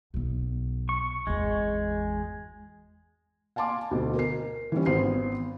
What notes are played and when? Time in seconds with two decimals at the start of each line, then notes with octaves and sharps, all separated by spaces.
0.14 B1 B3
0.89 C#6
1.27 G#1 E2 G#3
3.56 F5 G#5 A5 C6 D6
3.91 D2 B2
4.15 A#4 C7
4.72 E3 G3 C#4
4.86 G#1 B3 C5 C7